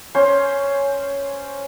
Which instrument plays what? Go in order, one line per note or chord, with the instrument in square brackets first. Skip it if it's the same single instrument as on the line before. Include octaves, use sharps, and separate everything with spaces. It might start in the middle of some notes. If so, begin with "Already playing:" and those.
[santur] C#4 C5